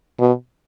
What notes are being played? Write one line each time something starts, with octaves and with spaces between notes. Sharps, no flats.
B2